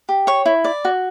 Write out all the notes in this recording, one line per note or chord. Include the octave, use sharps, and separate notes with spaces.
G4
C#5 C#6
E4
D5
F#4